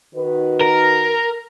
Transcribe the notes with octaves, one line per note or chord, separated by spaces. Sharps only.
D#3 F#4 B4
A#4